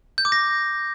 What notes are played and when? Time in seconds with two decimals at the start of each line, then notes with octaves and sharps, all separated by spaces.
0.18 G6
0.25 D6
0.32 A#6